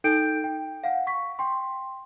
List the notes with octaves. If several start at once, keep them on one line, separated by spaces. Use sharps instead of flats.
D#4 A4 G5 G6 D7
G5
F5 F#5
C#6 B6
G5 C6